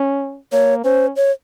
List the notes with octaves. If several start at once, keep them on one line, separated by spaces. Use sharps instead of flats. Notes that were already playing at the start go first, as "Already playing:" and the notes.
Already playing: C#4
A#3 C#5
C#4 C5
C#5